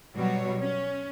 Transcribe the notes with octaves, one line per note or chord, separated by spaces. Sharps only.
B2 F#3 G3 F#4 C#5
C#4